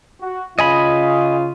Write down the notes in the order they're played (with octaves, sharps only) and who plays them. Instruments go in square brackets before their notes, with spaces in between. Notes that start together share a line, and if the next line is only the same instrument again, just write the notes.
[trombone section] F#4
[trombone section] C#3 F4 [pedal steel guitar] D#5 G#5 B5